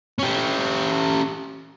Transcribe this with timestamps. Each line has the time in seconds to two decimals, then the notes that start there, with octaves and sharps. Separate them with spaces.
0.19 C#4 G4